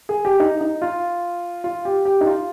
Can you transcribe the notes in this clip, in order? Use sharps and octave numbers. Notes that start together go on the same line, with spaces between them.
G#4
G4
D#4
D#4
F4
F4
G4
G4
D#4
F4